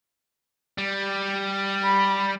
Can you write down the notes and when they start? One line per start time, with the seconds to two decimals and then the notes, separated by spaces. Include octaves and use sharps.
0.78 G3
1.84 B5